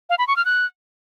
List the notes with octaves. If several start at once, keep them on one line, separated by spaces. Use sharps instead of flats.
F5
B5
C#6
F6
F#6